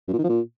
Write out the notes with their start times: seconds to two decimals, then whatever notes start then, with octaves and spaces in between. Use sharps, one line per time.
0.08 F#2
0.13 A#2
0.18 D#3
0.24 F3
0.29 A#2